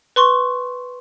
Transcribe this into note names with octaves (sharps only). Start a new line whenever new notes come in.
B4 C6 C#6